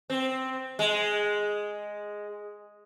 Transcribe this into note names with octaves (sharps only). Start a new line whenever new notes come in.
C4
G#3